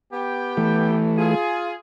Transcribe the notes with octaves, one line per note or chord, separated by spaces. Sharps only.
B3 G4 G5
E3 A3
F4 G#4